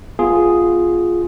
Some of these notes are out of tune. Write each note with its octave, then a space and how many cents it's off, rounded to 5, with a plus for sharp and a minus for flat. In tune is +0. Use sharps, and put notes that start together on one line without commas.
B3 +0 F4 +0 G#4 +0